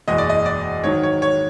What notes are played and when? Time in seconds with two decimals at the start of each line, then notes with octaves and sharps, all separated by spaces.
0.08 F#1 E2 B2 G#3 D#5
0.18 D5
0.29 D#5
0.46 D5
0.84 G#2 D#3 F#3 C#5
1.03 C#5
1.22 C#5